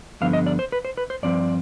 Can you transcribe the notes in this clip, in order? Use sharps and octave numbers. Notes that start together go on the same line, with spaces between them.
G2 D3 F3 B3 F5
D#5
D5
C5
B4
C5
B4
C5
G2 F3 C4 D5